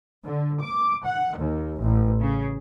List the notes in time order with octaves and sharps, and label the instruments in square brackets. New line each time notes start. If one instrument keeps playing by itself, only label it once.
[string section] D3
D6
F#5
D#2
A1
C#3